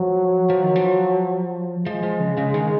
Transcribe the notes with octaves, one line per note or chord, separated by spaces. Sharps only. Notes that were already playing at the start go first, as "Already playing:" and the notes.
Already playing: F3 F#3
F3
D#3
F3
F3 G#3
F3
C#3
C#3
D#3